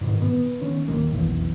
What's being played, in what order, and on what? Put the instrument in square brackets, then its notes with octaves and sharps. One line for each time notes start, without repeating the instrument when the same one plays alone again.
[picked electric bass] G#2 B2 D3 D#3
B3
D#3 C#4
D#1 F#2 D#3 A#3
F1 B1 E2